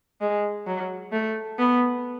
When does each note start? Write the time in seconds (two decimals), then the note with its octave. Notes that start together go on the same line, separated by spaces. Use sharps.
0.21 G#3
0.67 F#3
1.12 A3
1.59 B3